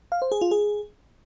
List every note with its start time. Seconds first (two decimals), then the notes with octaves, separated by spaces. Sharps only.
0.12 F5
0.22 C5
0.32 G#4
0.41 F4
0.51 G#4